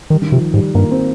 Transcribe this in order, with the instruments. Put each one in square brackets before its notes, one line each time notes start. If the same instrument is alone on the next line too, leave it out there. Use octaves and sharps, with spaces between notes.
[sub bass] D#3 [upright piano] G3
[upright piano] D#3
[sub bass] C3 [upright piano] F3
[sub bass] G#2 [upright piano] G3
[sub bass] G2 [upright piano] A#3
[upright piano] C4